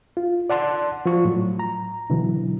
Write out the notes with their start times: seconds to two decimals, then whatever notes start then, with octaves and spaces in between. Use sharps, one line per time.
0.17 F4
0.50 D5 F#5 A5 C6
1.06 F3 F4 C#6
1.25 A2 F#3
1.59 A#5
2.10 B2 D3 E3 F#3